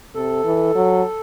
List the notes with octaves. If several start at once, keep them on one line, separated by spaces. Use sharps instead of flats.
C3 A4
E3
F#3